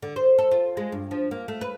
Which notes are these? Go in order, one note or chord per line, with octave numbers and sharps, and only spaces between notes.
D3
C5
A4
F4
G#3
G2
F3
A#3
A3
B4